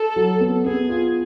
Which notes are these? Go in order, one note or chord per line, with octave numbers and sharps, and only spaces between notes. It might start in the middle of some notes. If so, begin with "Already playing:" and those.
Already playing: A4
F#3
B3
B3 G#4
F4